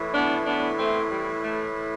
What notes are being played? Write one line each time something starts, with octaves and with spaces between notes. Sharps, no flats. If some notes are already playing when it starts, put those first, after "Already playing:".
Already playing: A2 E3
B3 D4
B3 D4
A3 C4
G3
A3